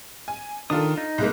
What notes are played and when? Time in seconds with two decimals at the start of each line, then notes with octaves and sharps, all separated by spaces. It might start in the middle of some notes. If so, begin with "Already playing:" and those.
0.28 G#5
0.70 D#3 D4 F4 A4 D#6
0.98 D#4
1.18 C2 G#3 A#3